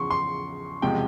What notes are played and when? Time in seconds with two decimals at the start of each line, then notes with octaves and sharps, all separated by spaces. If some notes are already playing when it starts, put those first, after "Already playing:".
Already playing: E2 C#3 F3 C6 C#6
0.11 C6
0.82 F#1 E2 C3 F3 G#3 G5